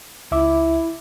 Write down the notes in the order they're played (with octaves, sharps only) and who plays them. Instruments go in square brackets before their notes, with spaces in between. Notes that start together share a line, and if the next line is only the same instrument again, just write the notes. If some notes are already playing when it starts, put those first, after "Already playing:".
[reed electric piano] C#2 E5 D6 [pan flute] E4